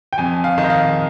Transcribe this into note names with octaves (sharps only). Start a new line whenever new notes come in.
G5
F2 G#5
F5
D#3
D#5
F5